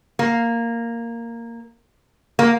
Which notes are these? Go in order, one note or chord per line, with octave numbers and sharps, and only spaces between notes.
A#3
A#3